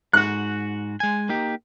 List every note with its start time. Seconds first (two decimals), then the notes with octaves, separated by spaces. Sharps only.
0.13 G#2 F#4 F#6
1.00 G#3 G#5
1.29 A#3 D#4 G4